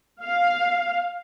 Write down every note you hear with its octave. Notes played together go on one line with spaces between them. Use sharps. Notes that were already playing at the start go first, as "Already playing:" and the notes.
F5